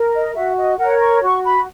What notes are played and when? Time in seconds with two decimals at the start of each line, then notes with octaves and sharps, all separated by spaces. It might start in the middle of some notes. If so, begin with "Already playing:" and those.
Already playing: A#4
0.15 D#5
0.36 F#4 E5
0.58 D#5
0.79 A#4 C#5 F#5
1.01 C#6
1.23 F#4 C#6
1.45 B5